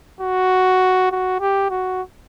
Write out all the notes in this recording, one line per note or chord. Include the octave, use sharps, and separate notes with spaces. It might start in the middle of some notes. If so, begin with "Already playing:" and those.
F#4
F#4
G4
F#4